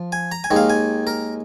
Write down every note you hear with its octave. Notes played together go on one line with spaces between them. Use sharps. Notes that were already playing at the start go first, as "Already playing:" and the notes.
Already playing: F3
G#5
A#5
G#5
D#2 D#3 G#3
F5
G#5
A#4